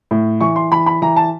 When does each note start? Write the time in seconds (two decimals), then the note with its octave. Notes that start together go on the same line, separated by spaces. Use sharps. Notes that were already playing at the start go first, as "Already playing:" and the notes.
0.11 A2
0.41 E3 C#6
0.56 C6
0.72 E3 B5
0.86 B5
1.02 E3 A#5
1.16 A5